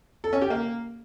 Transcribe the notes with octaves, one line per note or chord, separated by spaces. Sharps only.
A4
C#4
G4
A#3